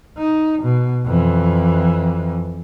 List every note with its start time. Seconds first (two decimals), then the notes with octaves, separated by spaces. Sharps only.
0.18 D#4
0.63 B2
1.06 F2 E3